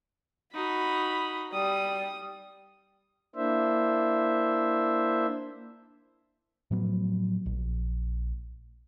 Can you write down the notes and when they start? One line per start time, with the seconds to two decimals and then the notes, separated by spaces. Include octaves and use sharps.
0.55 D#4 F#4 B5
1.53 G3 D#6
3.36 A#3 D4 E4 C5 E5
6.71 A2 F3 F#3 B3
7.46 A#1